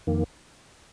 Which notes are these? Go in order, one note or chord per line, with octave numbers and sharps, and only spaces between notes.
F2 D#3 A#3